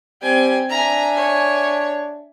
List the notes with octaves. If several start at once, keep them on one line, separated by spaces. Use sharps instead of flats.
G3 C4 G5 G#5
D4 E5 G#5 A#5
C#5